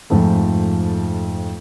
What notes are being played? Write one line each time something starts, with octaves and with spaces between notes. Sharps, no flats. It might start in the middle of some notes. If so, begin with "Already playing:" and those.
F2 G#2 F3 A3